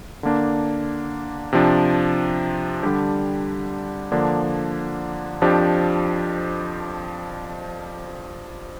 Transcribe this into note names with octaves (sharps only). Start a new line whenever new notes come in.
D3 A#3 D4
C3 F3 D4
D3 G3 D4 G4
D3 F3 A#3 D4
F2 F3 D4 G4